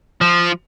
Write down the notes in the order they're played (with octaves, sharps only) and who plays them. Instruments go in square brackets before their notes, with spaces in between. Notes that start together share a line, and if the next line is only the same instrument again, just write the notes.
[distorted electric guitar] F3